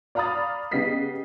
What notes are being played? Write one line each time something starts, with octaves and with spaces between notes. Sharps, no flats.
D5 F5 A#5 B5 D#6 A6
C#3 B3 G4 D#5 B6 C7